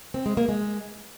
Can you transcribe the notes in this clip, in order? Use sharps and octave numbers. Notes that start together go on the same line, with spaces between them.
C4
G#3
A#3
G#3